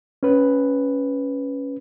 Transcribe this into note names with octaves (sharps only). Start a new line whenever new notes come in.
C#4 B4